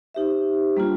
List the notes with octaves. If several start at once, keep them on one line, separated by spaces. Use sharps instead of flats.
D#4 G4 C5 E5
G3 A#3 D4 F4